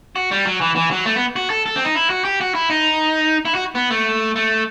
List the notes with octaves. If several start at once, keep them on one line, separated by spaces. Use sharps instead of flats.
F#4
G3
F#3
E3
E3
F#3
A3
B3
F#4
A4
A4
C4
D#4
E4
F#4
G4
F#4
E4
D#4
E4
F#4
B3
A3
A3